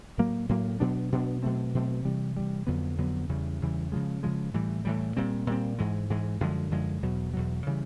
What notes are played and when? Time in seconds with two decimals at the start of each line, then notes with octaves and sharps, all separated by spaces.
0.18 A2 F#3 A#3
0.49 A2 F#3 A#3
0.80 B2 F#3 B3 D4
1.12 B2 F#3 B3 D4
1.43 B2 F#3 A3 C4
1.75 B2 F#3 A3 C4
2.05 C3 E3 G3
2.37 C3 E3 G3
2.67 F2 D3 F#3 B3
2.98 F2 D3 F#3 B3
3.29 E2 C#3 E3 G3
3.61 E2 C#3 E3 G3
3.92 C#3 F3 G#3
4.23 C#3 F3 G#3
4.54 A2 E3 G3
4.85 A2 E3 G3
5.17 A#2 G3 C4
5.47 A#2 G3 C4
5.78 G#2 E3 G#3
6.10 G#2 E3 G#3
6.41 F#2 D3 F3 G#3
6.71 F#2 D3 F3 G#3
7.03 E2 B2 F#3
7.34 E2 B2 F#3
7.67 C#3 E3 G3